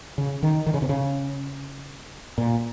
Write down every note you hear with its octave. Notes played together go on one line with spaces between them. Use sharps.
C#3
D#3
D#3
C#3
C3
C#3
A#2